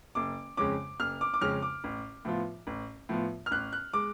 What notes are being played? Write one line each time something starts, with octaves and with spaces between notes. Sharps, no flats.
F#1 D6
F2 C#3 G#3 C#4 D6
F#1 F6
D6
D6
F2 C#3 G#3 C#4 F6
D6
A1
A2 F3 B3 F4
A1
A2 F3 B3 F4
F6
A1 F#6
F#6
G#3 D6